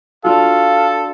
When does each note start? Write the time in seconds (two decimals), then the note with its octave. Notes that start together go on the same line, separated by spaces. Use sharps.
0.24 D4 F4 F#4 A4 F5